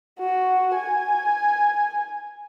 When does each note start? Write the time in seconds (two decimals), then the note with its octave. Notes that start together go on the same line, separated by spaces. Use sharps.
0.20 F#4
0.76 G#5